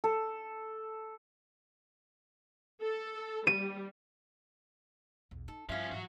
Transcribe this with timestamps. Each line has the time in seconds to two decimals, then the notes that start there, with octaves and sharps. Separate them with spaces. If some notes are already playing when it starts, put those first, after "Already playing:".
0.04 A4
2.82 A4
3.47 G3 D#7
5.31 B1 E2
5.48 D#4 A4
5.69 G2 D3 F3 C#4 E4 F5
5.92 G#2 E3 F#3 F#4